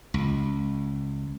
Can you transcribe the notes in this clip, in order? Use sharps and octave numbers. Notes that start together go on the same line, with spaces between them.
C#2